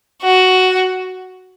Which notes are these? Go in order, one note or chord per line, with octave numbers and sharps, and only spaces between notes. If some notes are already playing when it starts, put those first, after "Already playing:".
F#4